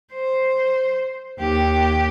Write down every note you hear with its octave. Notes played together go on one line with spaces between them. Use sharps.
C5
D#2 G4